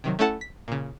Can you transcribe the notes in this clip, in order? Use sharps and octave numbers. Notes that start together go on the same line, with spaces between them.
C3 D#3 F#3
A3 C#4 E4 A4 F#5 A5
B6
A#2 C#3